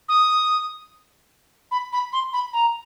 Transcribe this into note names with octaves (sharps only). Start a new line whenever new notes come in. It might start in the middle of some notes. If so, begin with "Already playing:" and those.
D#6
B5
B5
C6
B5
A#5